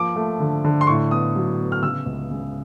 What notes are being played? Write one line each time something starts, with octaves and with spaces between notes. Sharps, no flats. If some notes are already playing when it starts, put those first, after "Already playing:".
Already playing: F3 A#3 D6
A3
D3
D3
C6
A2 C#6
B3 D#6
F#3
B3
F6
C#3 E6
C#2
C#3